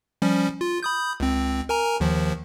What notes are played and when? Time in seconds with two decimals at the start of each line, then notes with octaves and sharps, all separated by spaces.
0.22 F3 G3 C#4
0.61 F4
0.83 B5 D#6 G6
1.20 C#2 C4
1.69 A#4 G#5 A#5
2.00 D#2 D#3 F3